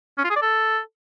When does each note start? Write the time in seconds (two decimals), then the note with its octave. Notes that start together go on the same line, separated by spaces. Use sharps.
0.18 C#4
0.24 F4
0.30 G#4
0.36 D5
0.42 A4